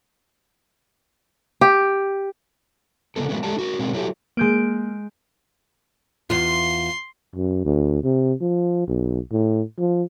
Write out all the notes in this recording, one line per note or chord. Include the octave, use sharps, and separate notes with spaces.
G4
C#3 A#3 B3 A4
F3 F#3 G#3 A3 B3 C#4
G#3 A3 G4 A4 D5 A5
D#4 F#4 A#4
B2 D#3 G#3 A#3 C4
F#3 E4 F#4 G4 A4
G#3 A#3 G6 D7
E2 F4 C6
F#2
D2
C3
F3
B1
A2
F3